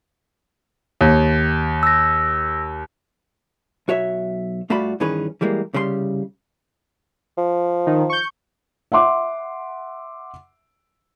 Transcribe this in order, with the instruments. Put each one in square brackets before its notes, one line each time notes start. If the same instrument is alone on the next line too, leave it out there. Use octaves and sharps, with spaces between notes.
[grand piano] D#2
[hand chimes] E6 A#6
[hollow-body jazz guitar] B1 F#4 C#5 E5
G2 A3 F4 F#4 D5 B5
G2 D#3 E3 C#4 G#4 B4
E3 G3 G#3 A#3
C2 C#3 G3 G#4 C6
[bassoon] F3
[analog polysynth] D#3
C#6 G6
[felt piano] E5 F#5 C6 D6